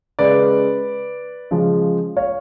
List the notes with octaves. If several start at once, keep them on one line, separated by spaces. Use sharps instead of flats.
C#3 G#3 B4 D5
C#3 F3 G#3
C#5 F5